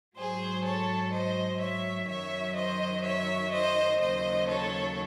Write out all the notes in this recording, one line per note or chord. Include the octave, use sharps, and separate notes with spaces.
G#2 F#3 G#4 C5
A4 C#5
C5 D#5
C#5 E5
F#2 D#3 F#3 C#5 E5
C5 D#5
C#5 E5
C5 D#5
D#2 C#3 F#3 C5 D#5
A4 C#5